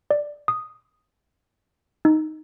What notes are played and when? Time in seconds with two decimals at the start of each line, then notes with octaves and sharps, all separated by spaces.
0.11 D5
0.48 D#6
2.05 D#4